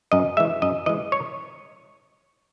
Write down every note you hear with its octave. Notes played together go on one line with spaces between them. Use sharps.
F#2 D#5
E3 G#3 E5
F#2 D#5
E3 G#3 D#5
C#5